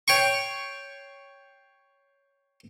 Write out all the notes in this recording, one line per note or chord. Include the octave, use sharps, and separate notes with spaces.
C#5 G5 C6 C#6